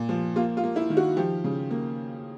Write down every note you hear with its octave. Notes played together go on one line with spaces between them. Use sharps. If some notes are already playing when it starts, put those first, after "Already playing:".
Already playing: A#2
F3
A#3 F4
F4
A#3
E4
D#3
F#4
F3 G4
C#3
A#3